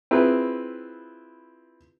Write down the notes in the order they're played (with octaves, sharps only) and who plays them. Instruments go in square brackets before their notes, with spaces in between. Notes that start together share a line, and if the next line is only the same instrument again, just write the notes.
[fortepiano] C4 E4 F4 G#4 B4